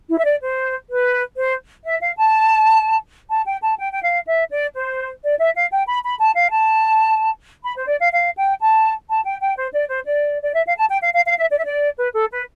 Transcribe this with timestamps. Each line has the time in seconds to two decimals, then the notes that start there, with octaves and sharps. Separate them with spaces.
0.08 E4
0.18 E5
0.24 D5
0.40 C5
0.89 B4
1.37 C5
1.85 E5
2.01 F5
2.17 A5
3.30 A5
3.45 G5
3.62 A5
3.78 G5
3.92 G5
4.02 F5
4.27 E5
4.50 D5
4.75 C5
5.23 D5
5.39 E5
5.55 F5
5.71 G5
5.86 B5
6.04 B5
6.19 A5
6.36 F5
6.51 A5
7.64 B5
7.76 C5
7.88 D5
8.00 F5
8.12 F5
8.37 G5
8.60 A5
9.09 A5
9.24 G5
9.41 G5
9.57 C5
9.73 D5
9.88 C5
10.05 D5
10.42 D5
10.54 E5
10.66 F5
10.77 A5
10.89 G5
11.02 F5
11.14 F5
11.25 F5
11.38 E5
11.49 D5
11.58 E5
11.65 D5
11.97 B4
12.14 A4
12.31 B4